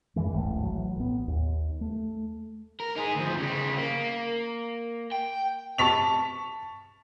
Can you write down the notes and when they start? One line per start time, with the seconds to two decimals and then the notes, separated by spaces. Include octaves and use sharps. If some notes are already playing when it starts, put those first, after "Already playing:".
0.16 F#2 D#3 E3 G#3
0.33 D1 A1 G#2 A3
0.62 E3 F#3
0.96 A1 B3
1.28 D#2
1.81 A3
2.80 A#4
2.96 D#4 G#4
3.15 D2 F3
3.38 C#3 G3
3.77 A#3
5.12 G5
5.78 A5 C#6 B6 F7